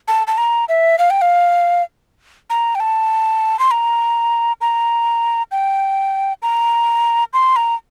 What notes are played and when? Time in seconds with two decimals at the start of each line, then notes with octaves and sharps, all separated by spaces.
0.08 A5
0.27 A5
0.38 A#5
0.69 E5
0.99 F5
1.10 G5
1.22 F5
2.50 A#5
2.75 G5
2.80 A5
3.59 C6
3.71 A#5
4.61 A#5
5.52 G5
6.42 A#5
7.33 C6
7.56 A#5